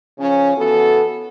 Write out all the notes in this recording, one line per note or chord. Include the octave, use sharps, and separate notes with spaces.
C#3 F3 C#4
E3 B3 F#4 A4